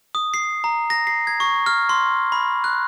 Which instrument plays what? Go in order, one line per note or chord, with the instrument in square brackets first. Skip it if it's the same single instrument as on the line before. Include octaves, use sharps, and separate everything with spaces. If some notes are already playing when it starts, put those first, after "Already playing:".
[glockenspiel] D#6
C7
A#5
A#6
C7
G#6
C#6
F6
C6
B5
F#6